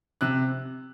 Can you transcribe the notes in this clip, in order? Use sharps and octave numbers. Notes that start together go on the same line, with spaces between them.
C3 F#6